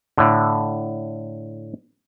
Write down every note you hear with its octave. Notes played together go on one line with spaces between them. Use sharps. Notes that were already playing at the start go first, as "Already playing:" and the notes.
A2 D3